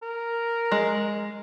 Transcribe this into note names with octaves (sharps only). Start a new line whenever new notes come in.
A#4
G#3